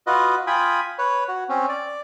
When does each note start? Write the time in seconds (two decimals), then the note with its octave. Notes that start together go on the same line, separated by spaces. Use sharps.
0.07 F4 F#4 B4 D#5
0.47 F4 G5 G#5 B5 D#6
0.98 B4 C#5
1.28 F#4
1.49 C4 C#4
1.69 D5